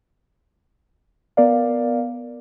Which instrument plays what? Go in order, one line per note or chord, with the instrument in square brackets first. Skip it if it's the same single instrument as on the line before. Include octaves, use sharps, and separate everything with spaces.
[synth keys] B3 A#4 D5 F5